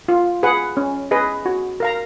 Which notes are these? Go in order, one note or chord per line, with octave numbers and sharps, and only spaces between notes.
F4
G#4 B4 F#5
C#4
G#4 B4 D#5
F#4
A#4 F5 A#5